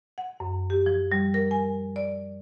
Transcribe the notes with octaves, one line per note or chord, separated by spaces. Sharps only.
F#5
F#2
G4
F3
G3
A#4
G#5
D5